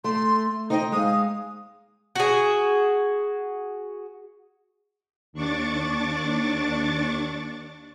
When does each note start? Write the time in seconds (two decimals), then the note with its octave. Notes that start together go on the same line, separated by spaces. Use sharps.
0.04 A3 C6
0.70 D#4 C5 D#5 G5
0.92 G#3 F5 D#6
2.15 F#4 G#4
5.33 D#2 D4 C#6 D6 A6